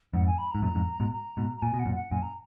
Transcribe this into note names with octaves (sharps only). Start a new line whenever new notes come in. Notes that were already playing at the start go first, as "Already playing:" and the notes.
F2 G#2 F#5
G#5
B5
A#5
G#2
F#2 A#2 A#5
F2 G#2
G#2 B2
A#5
G#2 B2
A#5
A#2 G#5
B2
F#5
F#2 A#2
F#5
F#2 A#2 G#5
A#5